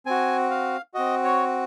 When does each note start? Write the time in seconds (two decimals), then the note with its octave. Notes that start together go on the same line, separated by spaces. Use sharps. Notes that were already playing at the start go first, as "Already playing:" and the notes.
0.06 C4 F#4 G#5
0.50 F5
0.94 C4 F#4 D#5
1.24 C#5